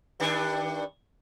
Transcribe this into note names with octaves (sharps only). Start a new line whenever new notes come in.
G2 D#3 D4